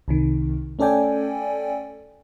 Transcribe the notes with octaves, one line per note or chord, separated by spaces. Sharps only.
C2 C3 D#3
A3 C#4 A4 D5 G5 G#5